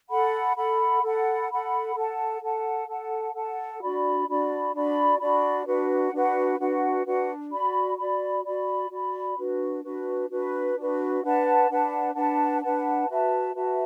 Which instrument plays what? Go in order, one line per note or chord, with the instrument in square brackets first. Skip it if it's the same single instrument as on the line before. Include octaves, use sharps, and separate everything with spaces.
[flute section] A4 F#5 B5
A4 F#5 B5
A4 F#5 B5
A4 F#5 B5
A4 F#5 A5
A4 F#5 A5
A4 F#5 A5
A4 F#5 A5
D4 F#4 D5 B5
D4 F#4 D5 B5
D4 F#4 D5 B5
D4 F#4 D5 B5
D4 F#4 B4 F#5
D4 F#4 B4 F#5
D4 F#4 B4 F#5
D4 F#4 B4 F#5
F#4 D5 B5
F#4 D5 B5
F#4 D5 B5
F#4 D5 B5
D4 F#4 B4
D4 F#4 B4
D4 F#4 B4
D4 F#4 B4
D4 B4 F#5 A5
D4 B4 F#5 A5
D4 B4 F#5 A5
D4 B4 F#5 A5
F#4 B4 E5 A5
F#4 B4 E5 A5